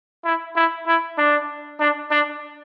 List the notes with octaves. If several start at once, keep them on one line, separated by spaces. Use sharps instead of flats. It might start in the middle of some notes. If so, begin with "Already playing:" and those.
E4
E4
E4
D4
D4
D4